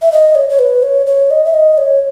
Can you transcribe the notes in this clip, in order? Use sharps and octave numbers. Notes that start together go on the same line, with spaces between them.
E5
D#5
C#5
C#5
B4
C#5
C#5
D#5
E5
D#5
C#5